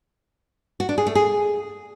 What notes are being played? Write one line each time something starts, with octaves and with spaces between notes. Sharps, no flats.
F#4
D4
G#4
A3
G#4